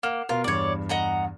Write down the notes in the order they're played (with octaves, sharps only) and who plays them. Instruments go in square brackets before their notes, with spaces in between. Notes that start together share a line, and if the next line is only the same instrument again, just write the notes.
[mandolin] A#3 [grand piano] F#5 F6 E7
[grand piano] B2 A#4 [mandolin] F4
[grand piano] E2 G2 [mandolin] C#5 D5
[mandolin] D#5 F#5 A#5